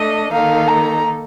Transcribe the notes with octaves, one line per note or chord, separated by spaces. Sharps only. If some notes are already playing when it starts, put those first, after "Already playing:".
Already playing: A3 D4 A4 D#5
D#3 A#3 D#4 A4 F5
A#5